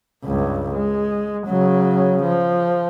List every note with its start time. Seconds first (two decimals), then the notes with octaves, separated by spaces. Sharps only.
0.25 C#2 G2
0.75 G#3
1.47 C#3 F#3
2.23 F3